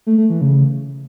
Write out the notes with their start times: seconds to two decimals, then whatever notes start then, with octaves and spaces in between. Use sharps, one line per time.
0.06 A3
0.18 A3
0.30 E3
0.41 C#3